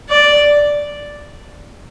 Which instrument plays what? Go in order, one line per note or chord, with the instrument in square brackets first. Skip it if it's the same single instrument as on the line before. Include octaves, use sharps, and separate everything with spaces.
[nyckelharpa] D5